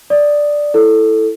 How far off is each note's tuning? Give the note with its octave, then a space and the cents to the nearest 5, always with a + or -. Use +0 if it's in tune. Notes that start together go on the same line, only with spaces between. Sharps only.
D5 +0 D#6 +0
E4 +5 A4 +0